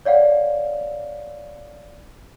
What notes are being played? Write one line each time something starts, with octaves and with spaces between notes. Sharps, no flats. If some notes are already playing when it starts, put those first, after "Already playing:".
C#5 D5 F5 F#5